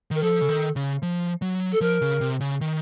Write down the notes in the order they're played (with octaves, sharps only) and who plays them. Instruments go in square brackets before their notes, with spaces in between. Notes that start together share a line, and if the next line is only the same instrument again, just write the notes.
[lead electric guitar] D#3 [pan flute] A#4
[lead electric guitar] F3 [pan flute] A4
[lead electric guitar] C#3
D#3
C#3
F3
F#3
[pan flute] A4
[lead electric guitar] F3 [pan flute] A#4
[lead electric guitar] C#3
C3
C#3
D#3